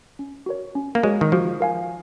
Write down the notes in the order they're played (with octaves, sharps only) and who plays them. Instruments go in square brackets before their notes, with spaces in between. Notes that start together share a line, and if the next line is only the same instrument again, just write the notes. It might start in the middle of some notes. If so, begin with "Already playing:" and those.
[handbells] C#4
F#4 A#4 C#5
C#4
[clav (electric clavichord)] A#3
[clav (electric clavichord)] G#3 [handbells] F#4 A#4 C#5
[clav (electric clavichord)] D#3
[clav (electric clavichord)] F3 [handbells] F#4
[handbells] A#4 F5 G#5